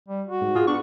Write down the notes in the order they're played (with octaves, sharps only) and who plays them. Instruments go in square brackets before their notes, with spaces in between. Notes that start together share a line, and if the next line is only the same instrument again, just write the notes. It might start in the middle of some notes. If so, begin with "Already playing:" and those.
[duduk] G3
F#4
[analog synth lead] G#2
[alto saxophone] F4 [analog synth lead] G#4
[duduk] B3 [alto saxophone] D4 [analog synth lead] C#6